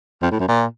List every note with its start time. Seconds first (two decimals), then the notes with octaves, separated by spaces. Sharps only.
0.23 F2
0.31 A2
0.40 F#2
0.48 A#2